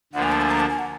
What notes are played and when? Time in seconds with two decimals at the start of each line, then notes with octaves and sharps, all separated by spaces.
0.13 D2 D3 F3 A#3 F#5
0.23 G#5
0.32 A5
0.41 G#5
0.51 A#5
0.60 A5
0.69 G#5
0.79 F#5